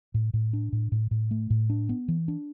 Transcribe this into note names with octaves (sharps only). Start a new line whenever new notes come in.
A2
A2
D4
A2
A2
A2
A3
A2
D4
B3
E3
D4